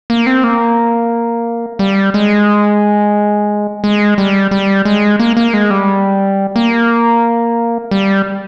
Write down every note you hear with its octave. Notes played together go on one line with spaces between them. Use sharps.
A#3
C4
A#3
G3
G#3
G#3
G3
G3
G#3
A#3
A#3
G#3
G3
A#3
G3